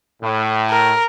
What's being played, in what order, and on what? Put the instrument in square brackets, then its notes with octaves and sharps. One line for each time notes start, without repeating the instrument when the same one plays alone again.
[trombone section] A2
[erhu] A#4